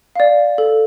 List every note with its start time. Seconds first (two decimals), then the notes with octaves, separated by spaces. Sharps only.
0.16 D5 F5
0.58 A4